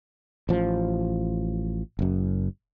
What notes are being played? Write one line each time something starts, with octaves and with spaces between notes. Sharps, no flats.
A1 F3
F#1 F#2